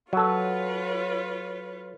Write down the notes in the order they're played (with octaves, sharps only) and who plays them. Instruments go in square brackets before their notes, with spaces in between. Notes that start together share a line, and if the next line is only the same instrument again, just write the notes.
[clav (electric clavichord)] F#3 A4 [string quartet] F4 B4 C#5